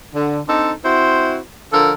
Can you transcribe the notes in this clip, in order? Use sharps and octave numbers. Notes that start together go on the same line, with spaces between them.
D3
C4 D4 D#4 A4
C4 E4 F#4 C5
D3 F3 A4 A#4